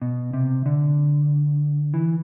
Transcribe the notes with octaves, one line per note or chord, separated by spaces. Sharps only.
B2
C3
D3
E3